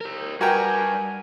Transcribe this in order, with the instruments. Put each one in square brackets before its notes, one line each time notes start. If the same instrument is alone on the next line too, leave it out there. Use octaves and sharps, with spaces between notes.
[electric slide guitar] G4 A#4
[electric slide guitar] G3 B4 [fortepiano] F#4 A#4 G5 [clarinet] G#5